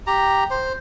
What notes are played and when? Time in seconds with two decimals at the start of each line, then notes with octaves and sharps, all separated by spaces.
0.07 G4 A#5
0.51 C5